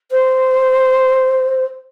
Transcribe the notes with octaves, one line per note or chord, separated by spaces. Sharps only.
C5